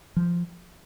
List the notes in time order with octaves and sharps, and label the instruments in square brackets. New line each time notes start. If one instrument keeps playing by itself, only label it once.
[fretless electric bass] F3